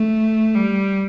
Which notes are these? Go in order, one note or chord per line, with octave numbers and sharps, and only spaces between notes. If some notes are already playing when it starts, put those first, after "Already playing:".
Already playing: A3
G3